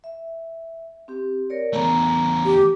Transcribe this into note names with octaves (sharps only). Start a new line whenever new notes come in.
E5
C4 G4
A#4 C#5 D5
E2 A3 B3 A#5
G4